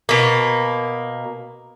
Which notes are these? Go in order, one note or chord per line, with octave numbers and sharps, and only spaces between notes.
B2 A#3